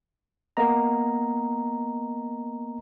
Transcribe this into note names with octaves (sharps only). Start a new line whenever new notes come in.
A#3 B3 D#5 A#5